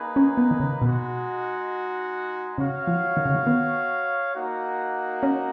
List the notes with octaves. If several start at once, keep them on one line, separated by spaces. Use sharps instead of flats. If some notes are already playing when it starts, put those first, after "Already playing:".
Already playing: A#3 D#4 G#4 B4
C#4
B3
D#3
C#3
B2 G#3 D#4 F#4
C#3 F#4 C#5 F5
F3
D#3
C#3
D#3
B3
A#3 D#4 F#4
C#4